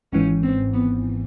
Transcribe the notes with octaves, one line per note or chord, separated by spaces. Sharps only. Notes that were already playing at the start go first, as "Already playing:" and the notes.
G#1 G#2 E3 C#4
C4
B3